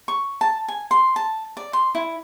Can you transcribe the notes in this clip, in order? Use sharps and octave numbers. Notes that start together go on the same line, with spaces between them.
C#6
A5
G#5
C6
A5
D5
C6
E4